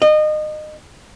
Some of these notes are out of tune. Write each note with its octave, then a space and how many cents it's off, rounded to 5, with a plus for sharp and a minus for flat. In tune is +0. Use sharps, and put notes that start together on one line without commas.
D#5 -25